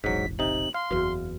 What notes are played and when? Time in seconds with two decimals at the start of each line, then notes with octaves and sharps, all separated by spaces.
0.04 E1 A1 G#2 F#3 B6
0.39 C3 D#4 F#7
0.74 F5 C6
0.91 F#1 E2 F#4 B4